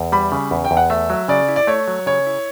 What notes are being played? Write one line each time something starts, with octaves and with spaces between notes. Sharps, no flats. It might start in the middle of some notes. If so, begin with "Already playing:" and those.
Already playing: E2
G3 B5
C#3
E2
G5
E2
F#5
A3 E5
F#3
C#3 D5
E4
D5
A3 C#5
F#3
C#3 C#5
E4